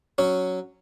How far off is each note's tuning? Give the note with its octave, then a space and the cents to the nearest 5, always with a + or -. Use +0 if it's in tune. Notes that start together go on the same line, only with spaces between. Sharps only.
F#3 +0 C#4 +0